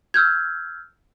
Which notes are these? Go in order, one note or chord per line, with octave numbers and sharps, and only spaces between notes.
E6 F6 G6 G#6